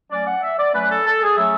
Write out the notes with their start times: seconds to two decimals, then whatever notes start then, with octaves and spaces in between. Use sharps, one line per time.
0.11 F#3 A3 C#4 D5
0.26 F#5
0.42 E5
0.59 D5
0.74 F#3 A3 C#4 B4
0.90 A4
1.06 A4
1.22 G#4
1.38 F#3 A3 C#4 E5